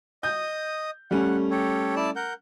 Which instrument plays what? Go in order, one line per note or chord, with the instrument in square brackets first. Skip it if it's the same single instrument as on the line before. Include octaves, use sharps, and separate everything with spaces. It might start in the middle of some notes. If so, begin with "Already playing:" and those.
[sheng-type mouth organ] D#5 D#6 [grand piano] G6
[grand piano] G3 A3 C#4 [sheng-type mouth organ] F#5
[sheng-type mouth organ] G4 A4 C#5
E4 D5 A5
A#4 F#5 G6